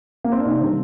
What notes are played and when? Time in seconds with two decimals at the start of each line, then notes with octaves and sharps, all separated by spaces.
0.24 A#3
0.32 C4
0.39 D4
0.46 C3 D#4
0.61 D#3 G3 C4